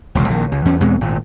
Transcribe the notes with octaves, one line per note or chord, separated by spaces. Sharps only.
E1 C#2 F#2 C3
A#1 D#3
C#2
E2 C#4
E2 B2 G#3 C4
G#1 A#2